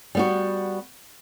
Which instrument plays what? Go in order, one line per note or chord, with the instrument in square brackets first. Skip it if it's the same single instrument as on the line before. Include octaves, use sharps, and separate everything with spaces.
[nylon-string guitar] G3 B3 F#4